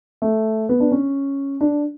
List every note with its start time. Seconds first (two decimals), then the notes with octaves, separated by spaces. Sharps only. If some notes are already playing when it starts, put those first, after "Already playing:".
0.22 A3
0.69 B3
0.80 D4
0.92 C#4
1.61 D4